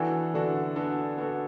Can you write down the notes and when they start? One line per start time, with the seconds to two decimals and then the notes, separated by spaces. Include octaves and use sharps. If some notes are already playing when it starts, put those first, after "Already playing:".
Already playing: E3 B3 D4 F#4 A4
0.34 D3 B3 D4 F#4 A4
0.76 B3 D4 F#4 A4
1.18 B3 D4 F#4 A4